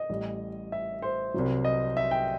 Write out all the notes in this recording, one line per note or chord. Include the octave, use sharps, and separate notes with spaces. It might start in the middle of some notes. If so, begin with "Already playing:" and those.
Already playing: D#5
A1 A2 G3
E5
C5
C2 C3 F#3
D#5
E5
G5